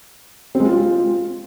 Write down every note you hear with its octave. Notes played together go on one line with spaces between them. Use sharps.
C4
G#3
F4